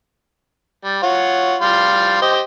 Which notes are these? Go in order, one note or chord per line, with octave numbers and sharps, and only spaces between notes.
G3
F4 C#5 F#5
G3 F5 C6
G4 C5 D#5